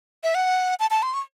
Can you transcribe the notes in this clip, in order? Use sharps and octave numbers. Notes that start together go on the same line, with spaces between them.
E5
F#5
A5
A5
C6
C#6